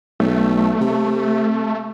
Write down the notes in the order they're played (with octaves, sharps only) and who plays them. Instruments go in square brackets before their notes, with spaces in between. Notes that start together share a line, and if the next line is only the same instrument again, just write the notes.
[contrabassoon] B1 [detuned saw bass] A3
[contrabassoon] C3